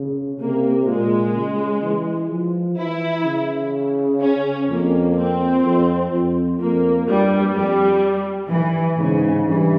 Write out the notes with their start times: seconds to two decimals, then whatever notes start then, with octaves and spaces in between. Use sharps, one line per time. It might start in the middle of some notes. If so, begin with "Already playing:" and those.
Already playing: C#3
0.39 C3 A#3
0.86 A#2 G#3
1.34 C#3
1.82 E3
2.30 F3
2.77 E3 E4
3.25 C#3
4.21 C#4
4.68 F2 A#3
5.16 C4
5.63 F2
6.11 F2
6.59 F2 A#3
7.07 G2 G3
7.54 F2 G3
8.50 E3
8.98 G#2 C#3
9.46 G2 E3